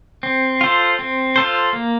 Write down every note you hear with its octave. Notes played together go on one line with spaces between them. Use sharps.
C4
F4 A4 C5
C4
F4 A4 C5
A#3